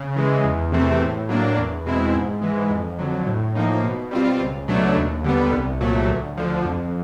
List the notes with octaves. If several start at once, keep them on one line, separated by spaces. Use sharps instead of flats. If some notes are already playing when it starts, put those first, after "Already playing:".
Already playing: C#3
E3 G#3
E2
C3 E3 A3 C4
A2
F#3 A#3 D4
E2
B2 G#3 C4 E4
G#2
E3 G#3
F2
D3 F#3
A2
F3 A#3 D#4
B2
G3 C4 F4
C#2
B2 F#3 A3 D4
D#2
D3 G3 B3
C2
A#2 F#3 A3
D2
D3 F3
F2